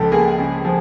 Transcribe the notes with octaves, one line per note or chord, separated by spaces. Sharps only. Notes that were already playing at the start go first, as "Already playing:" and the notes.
Already playing: C#2 C#3 F3 G4 A4
A#3 G#4
C#3
F3